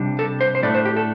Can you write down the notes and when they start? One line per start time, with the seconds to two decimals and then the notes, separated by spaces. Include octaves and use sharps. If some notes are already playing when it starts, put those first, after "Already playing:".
Already playing: C3 G3 D4
0.19 A4
0.41 C5
0.55 C5
0.63 A2 A3 D4 D5
0.75 C5
0.85 G4
0.96 A4